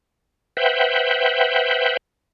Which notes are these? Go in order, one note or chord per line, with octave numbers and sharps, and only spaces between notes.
B4 C5 E5 F#5 G5